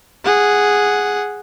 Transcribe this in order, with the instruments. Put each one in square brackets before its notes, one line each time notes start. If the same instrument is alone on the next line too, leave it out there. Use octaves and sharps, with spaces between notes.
[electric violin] G#4 F#5